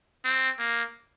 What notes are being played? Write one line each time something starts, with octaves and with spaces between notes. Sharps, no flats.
C4
A#3